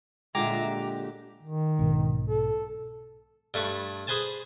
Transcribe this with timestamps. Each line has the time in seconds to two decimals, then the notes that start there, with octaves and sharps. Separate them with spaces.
0.35 A#2 D3 G#3 F4 E5 G5 A#5 D6
0.66 G4
1.43 D#3
1.79 B1 G#2 B2
2.29 A4
3.54 G2 A3 B4 C#6
4.07 G#4 B4 C5 G#5 A5